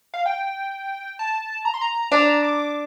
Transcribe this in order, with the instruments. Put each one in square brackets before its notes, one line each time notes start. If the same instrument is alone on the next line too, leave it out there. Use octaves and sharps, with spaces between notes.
[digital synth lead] F5
G5
A5
A#5
C6
A#5
[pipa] D4 [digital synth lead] A#5
[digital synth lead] D6